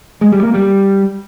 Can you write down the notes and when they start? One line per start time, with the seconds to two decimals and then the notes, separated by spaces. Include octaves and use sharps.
0.21 G#3
0.32 G3
0.43 A#3
0.54 G3